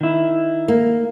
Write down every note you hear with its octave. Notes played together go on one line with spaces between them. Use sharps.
D#3 E4
A#3